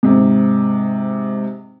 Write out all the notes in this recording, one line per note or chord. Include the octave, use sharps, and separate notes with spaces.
G#2 C3